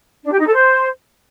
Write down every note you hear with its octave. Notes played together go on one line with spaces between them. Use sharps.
D4
G4
D#4
A4
C5